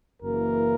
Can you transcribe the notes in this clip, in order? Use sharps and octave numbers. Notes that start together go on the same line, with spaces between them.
F#1 F#2 E3 A#3 A#4